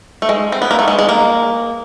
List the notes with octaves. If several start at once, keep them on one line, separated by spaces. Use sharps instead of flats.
A3
G#3
C4
B3
A#3
A3
G#3
G#3
A#3